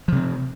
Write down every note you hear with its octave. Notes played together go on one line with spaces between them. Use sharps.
C3 F3 C4